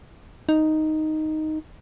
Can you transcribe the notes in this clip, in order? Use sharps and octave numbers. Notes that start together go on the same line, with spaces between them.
D#4